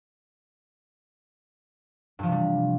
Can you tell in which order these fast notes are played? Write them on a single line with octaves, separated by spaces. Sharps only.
G2 F3 C3 G3